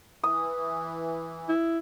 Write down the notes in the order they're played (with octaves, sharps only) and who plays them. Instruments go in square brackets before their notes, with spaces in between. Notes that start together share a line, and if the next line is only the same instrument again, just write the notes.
[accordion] E3 [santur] D#6
[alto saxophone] E4